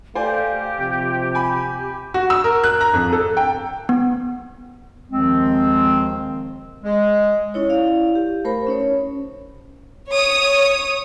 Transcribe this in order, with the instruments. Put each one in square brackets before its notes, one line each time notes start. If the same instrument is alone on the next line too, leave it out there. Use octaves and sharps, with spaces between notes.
[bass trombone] A3 [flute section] G4 [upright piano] C5 D5 G#5 [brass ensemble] F5
[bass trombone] C3 [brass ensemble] F3
[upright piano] G#5 B5
F#4
E6
A#4
F#6
A#5
F2
A4
G5
[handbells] B3
[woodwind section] D#2 D#3 F3 G#3 C4
G#3
[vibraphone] C#4 D#4 E4 C#5
E4 D5 F5
G4
A3 A#4 C5 B5
C#4 D#4 C#5
[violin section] C#5 D#6